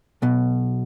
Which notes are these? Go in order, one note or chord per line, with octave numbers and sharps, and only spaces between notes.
B1 B2